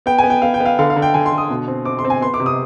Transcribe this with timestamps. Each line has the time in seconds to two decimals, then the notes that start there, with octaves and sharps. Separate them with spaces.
0.06 B3 G5
0.18 G#5
0.24 B3
0.30 G5
0.42 B3 F5
0.54 G5
0.60 B3
0.66 F5
0.79 D3 F5
0.90 F5
0.96 D3
1.02 G5
1.14 D3 G#5
1.26 C6
1.32 D3
1.38 D#6
1.50 B2
1.68 C4
1.85 C4 D6
1.99 C6
2.05 C4
2.10 G#5
2.21 B3 C6
2.34 D6
2.40 C3
2.46 D#6